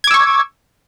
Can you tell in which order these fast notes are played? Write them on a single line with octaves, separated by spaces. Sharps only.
G#6 D6 E6 C#6